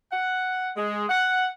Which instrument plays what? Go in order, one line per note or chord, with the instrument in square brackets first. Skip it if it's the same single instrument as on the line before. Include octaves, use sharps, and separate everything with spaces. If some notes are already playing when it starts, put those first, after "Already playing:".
[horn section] F#5
G#3
F#5